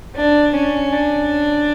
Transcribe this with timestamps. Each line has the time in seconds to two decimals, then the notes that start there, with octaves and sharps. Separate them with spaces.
0.15 D4
0.54 C#4
0.92 D4